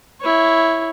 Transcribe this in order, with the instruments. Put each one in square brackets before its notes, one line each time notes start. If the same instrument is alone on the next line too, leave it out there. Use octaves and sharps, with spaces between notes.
[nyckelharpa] E4 C#5